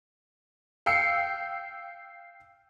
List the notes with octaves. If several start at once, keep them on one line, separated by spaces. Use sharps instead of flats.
F5 G5 E6 C7 C#7